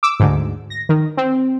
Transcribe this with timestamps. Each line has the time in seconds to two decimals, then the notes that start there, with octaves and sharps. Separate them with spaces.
0.03 D6 E6
0.20 D2 G#2
0.70 A#6
0.89 D#3
1.17 C4